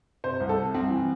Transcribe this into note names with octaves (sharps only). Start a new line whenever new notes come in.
C3 C5
C2
A4
C3
C2 C4
E3